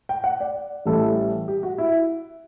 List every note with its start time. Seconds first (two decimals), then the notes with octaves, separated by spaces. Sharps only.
0.09 G5
0.24 F#5
0.40 D5
0.86 A1 A2 E3 G3 A4
1.48 G4
1.63 F#4
1.78 E4